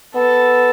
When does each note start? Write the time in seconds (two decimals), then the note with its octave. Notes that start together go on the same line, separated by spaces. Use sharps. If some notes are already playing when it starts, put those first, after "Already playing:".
0.15 B3 A4